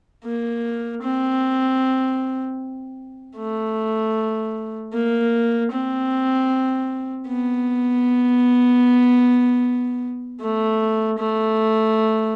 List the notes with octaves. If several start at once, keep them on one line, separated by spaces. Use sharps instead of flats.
A#3
C4
A3
A#3
C4
B3
A3
A3